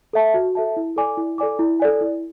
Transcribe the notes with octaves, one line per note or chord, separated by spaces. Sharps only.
A4 E5 A5
F#4
A4 E5 A5
E4
A4 D5 G#5 D6
E4
A4 D5 G#5 D6
E4
A4 D5 G#5
E4